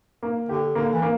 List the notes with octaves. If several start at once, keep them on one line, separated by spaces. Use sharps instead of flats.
A#3
D3 G4
D3 A#3
E3
A#3